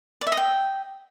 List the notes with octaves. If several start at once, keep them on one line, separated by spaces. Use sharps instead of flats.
D5
E5
D#5
G5